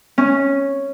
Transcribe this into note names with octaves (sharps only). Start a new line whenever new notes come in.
C#4